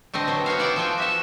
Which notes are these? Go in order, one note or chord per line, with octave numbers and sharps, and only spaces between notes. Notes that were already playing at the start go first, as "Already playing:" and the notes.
D3 A3 C4 D#5
F#3 B3 C4
B3 F#4 C#5 F5
E4 D5 F#5 G5
F3 A4 G5 G#5
F#4 E5 A5